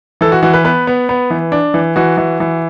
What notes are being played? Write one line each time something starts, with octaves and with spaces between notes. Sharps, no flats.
E3 A4
F#4
E3 F#4
B4
B3 B4
B3
B3
E3
D4
E3
E3 F#4
E3
E3